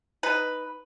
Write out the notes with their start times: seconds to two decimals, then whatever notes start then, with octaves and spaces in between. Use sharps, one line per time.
0.23 D#4 B4